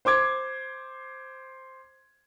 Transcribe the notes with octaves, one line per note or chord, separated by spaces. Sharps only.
C5 C6 D6 G#6